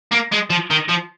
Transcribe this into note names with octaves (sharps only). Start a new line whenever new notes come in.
A#3
G#3
F3
D#3
F3